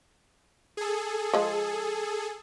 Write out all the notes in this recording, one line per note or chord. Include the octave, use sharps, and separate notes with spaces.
G#4 A4
F3 G#3